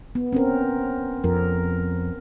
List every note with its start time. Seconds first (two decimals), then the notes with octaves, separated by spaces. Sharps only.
0.15 B3
0.33 C4 C#4 A#4
1.24 F2 A#4